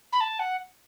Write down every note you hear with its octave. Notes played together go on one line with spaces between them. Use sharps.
B5
A5
F#5